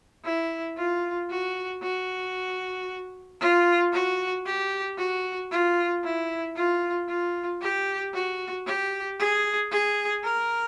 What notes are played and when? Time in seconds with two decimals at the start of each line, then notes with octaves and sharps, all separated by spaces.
0.24 E4
0.77 F4
1.30 F#4
1.82 F#4
3.40 F4
3.93 F#4
4.45 G4
4.98 F#4
5.51 F4
6.03 E4
6.56 F4
7.08 F4
7.61 G4
8.13 F#4
8.66 G4
9.19 G#4
9.71 G#4
10.24 A#4